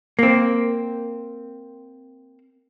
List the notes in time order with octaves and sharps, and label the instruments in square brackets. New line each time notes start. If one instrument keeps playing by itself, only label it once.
[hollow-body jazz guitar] A#3 C4